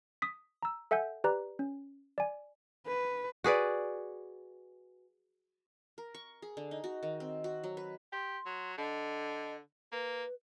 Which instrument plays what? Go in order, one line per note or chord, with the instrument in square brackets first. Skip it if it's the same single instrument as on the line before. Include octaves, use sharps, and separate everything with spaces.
[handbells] D#6 B6
A#5 E6
A4 E5 F#5 G#5 G6
G4 B4 D5 A#5 F#6
C#4
D5 G#5
[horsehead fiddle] B4
[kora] F#4 G#4 B4 D5
[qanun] A#4
C#6
G#4
D3
D#4
F#4
D#3
C4
F#4
F#3
B4
[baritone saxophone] G4 [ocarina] C6
[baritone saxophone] F#3
[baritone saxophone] D3 [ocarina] D#5
[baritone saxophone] A#3 [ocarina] B4